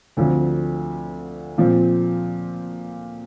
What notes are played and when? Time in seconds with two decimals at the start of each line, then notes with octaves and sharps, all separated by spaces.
0.17 D2 D3 F3 C4
1.58 A#2 F3 C4